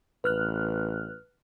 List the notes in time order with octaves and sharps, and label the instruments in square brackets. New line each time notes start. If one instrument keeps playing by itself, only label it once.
[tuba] A1 [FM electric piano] B4 F6 F#6